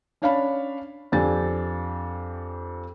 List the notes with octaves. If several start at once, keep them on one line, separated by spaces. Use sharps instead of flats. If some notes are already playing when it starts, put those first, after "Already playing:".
C#4 D4 C#5 F5 A5 B5
F2 C4 D4 G4 G#5 A6